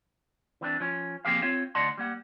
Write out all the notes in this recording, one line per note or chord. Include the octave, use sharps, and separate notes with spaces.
E3 C4 D4
F3 C#4
F3 A#3 C4 G4 G#4 F5
C4 F4 C#5
D2 D5 D#5 F#5 A5 C6
G3 A#3 F#5